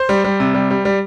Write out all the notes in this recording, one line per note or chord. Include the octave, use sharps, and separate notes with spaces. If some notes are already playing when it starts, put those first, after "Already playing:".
Already playing: C5
G3
G3
C3
G3
G3
G3